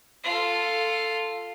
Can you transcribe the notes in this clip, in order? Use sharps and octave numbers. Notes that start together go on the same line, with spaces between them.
F4 A4